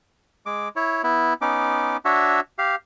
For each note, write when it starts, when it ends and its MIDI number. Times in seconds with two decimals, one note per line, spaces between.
0.46 0.69 56
0.46 0.69 86
0.76 1.02 64
0.76 1.02 73
1.04 1.34 59
1.04 1.34 64
1.41 1.97 59
1.41 1.97 61
1.41 1.97 63
1.41 1.97 86
2.05 2.40 62
2.05 2.40 66
2.05 2.40 73
2.05 2.40 76
2.58 2.76 67
2.58 2.76 77